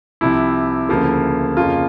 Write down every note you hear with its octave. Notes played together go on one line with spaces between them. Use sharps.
C2 C3 F3 E4
D2 C#3 F3 A#3
F2 C#3 F3 A#3 F4